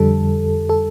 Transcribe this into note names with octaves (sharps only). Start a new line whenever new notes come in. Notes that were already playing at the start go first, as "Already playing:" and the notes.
Already playing: F2 D3 G3 A4
A4